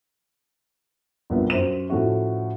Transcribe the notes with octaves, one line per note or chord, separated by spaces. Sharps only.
C2 G2 A#2 F3 A#3 B3
F#2 C5 E7
A2 F3 A3 C#4 F#4